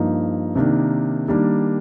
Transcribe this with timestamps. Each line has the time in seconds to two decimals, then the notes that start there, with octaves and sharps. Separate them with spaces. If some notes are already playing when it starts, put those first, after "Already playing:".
Already playing: G2 F3 A#3 D#4
0.55 C3 D#3 A#3 D4
1.28 D#3 G3 A#3 D4